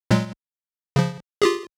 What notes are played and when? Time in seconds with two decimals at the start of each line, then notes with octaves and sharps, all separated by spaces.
0.11 A#2 F#3 G#3
0.96 C#3 F3
1.42 F4 G4 G#4